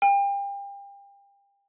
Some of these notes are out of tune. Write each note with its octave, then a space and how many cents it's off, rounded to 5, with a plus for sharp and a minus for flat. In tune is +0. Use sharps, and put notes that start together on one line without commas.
G5 +35